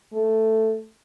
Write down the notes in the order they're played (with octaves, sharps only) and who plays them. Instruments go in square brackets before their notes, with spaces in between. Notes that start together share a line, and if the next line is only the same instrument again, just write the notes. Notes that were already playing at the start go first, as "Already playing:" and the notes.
[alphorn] A3